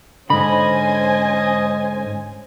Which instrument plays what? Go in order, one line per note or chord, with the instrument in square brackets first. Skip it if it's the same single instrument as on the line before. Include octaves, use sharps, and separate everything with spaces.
[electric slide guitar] G#2 D3 [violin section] C#4 C5 G#5 [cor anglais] D#5 [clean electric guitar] B5